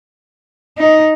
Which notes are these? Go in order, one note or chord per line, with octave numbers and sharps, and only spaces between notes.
D#4